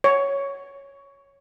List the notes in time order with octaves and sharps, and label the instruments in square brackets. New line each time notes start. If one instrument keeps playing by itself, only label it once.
[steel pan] C#5